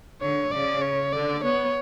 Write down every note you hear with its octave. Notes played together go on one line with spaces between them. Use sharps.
D3 C#5
C#3 D5
C#5
D3 D5
B3 C#5